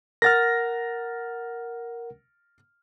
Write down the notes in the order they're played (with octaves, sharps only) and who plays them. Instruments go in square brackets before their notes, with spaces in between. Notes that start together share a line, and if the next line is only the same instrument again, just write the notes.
[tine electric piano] A#4 F#5 [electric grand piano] F6 A6 A#6